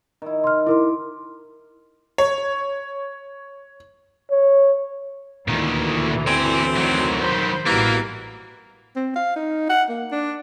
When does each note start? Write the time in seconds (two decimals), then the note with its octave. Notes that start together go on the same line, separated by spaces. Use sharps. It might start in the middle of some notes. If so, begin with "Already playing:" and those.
0.22 D#3 E4
0.44 C6 F6
0.67 E4 A#4 C6 D6
2.18 C#5
4.31 C#5
5.48 D2 A#2 D#3 E3
6.27 C4 D5 G#5
6.76 D#3 F#3
7.20 C5 B5
7.66 A1 B2 E3 G3 A#3 A#4
8.96 C4
9.16 F5
9.36 D#4
9.69 F#5
9.89 A#3
10.12 D4